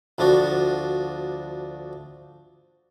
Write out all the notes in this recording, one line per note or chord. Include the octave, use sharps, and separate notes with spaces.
D2 F3 D4 F#4